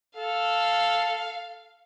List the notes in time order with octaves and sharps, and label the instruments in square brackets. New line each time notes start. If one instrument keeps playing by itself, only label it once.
[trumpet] A4 [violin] F5